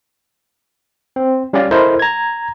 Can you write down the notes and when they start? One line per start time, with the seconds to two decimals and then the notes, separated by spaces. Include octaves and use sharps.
1.16 C4
1.53 G3 C#4 G4 D5 F5
1.71 E4 A4 A#4 C5 D#5
1.99 A#5 G#6